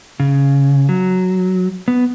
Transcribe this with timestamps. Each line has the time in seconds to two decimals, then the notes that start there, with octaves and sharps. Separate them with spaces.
0.20 C#3
0.89 F#3
1.88 B3